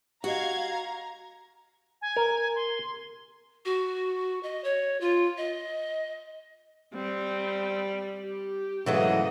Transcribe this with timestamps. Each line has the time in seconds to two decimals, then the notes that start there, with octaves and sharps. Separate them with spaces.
0.24 F#4 G4 D#5 F5 A#5 G#6
2.02 G#5
2.16 A#4
2.55 C6
3.65 F#4
4.43 D#5
4.64 C#5
5.00 F4
5.37 D#5
6.94 G3 C4
8.25 G4
8.86 G#2 C#3 E3 F#3 A3 D#5